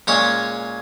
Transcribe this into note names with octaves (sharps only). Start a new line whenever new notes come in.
A#2 G#3 C#4 C#5